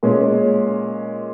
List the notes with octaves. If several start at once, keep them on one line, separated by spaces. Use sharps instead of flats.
A#2 G#3 C#4